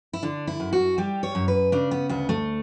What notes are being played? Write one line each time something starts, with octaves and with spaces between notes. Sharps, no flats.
E4
D3 D4
E4
F#2
F#4
G3 G4
C#5
F#2
B4
C#3 D4
B3
D2 B3
A3